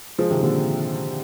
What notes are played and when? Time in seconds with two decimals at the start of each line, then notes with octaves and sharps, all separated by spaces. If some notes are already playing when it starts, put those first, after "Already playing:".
0.18 F3 G#3
0.30 C3 D#3
0.43 A#2 D3